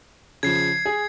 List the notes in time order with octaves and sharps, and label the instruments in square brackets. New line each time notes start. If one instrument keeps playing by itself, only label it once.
[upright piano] C#3 F3 [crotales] G#6 C7
[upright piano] G#4